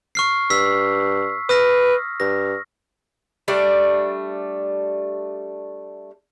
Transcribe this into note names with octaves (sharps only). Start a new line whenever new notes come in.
C#6 F6 C7
G2 E6 B6
B4 D#6 F6 A#6
G2 A#6
G3 A3 D4 D5